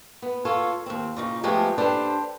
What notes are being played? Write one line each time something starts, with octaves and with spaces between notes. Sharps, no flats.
B3
F4 A4 C#5
D#2 C4
A#2 C#3 D#4
F3 G#3 A3 B3 G4 G#4
D4 G4 A4 B4 C5 D5